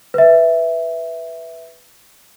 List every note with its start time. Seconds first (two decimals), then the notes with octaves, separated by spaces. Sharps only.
0.14 B4 E5